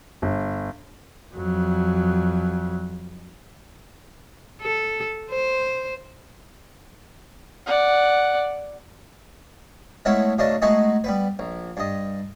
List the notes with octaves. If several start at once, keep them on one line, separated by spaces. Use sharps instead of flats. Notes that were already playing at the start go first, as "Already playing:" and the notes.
G1
F2 F#3
A4
C5
D5 F#5
G#3 A3 B3 C#4 E4
B1 C#3 A3 D4 D#5 A5
G#3 A3 B3 D#4 F#4 G#4
G3 B3 B4
A#1
G2 D#5